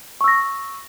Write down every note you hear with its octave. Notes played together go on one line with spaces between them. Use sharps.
C#6 E6 A#6